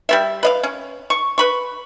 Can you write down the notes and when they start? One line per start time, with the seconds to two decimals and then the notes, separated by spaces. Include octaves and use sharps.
0.09 G3 B3 E5
0.43 B4 D#5 F5
0.63 C#4
1.10 C#6
1.38 B4 B5 C#6